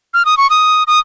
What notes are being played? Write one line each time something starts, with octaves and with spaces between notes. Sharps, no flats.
F6
D#6
C#6
D#6
D#6